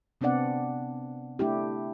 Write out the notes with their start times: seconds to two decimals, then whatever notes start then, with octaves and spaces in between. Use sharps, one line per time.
0.21 C3 B3 C4 D4 D5 F#5
1.39 A3 D4 E4 G4